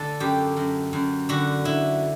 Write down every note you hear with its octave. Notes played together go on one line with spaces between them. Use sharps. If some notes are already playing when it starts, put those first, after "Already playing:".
Already playing: D3 A4
F#2 G4
F#2
F#2
D3 F#4
D3 E4